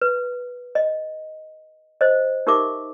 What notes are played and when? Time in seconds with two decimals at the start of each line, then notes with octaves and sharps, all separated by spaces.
0.02 B4
0.75 D#5
2.01 C5 D#5
2.47 D#4 G4 A#4 E5 D6